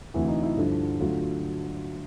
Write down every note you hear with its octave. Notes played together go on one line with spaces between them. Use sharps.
D2 C3 E3 E4
D#4
E4
G2 D3 F3
D2 D3 F#3 F4